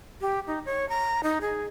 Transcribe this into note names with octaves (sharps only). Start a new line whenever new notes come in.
G4
D#4
C#5
A#5
D#4
G#4